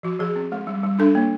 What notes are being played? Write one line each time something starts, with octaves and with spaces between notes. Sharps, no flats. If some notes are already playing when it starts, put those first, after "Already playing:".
F3 F#4
F3 G#4
C4
G#3
G3
G3
D4 A4
A#3